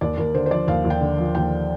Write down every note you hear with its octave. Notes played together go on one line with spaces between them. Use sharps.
D#2 D5
D#2 A#4
D3 C5
C5
F3 D5
D#2 F5
D#2
G5
D3
F3
D#2 G5